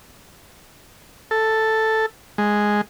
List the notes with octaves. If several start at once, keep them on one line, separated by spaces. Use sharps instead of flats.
A4
G#3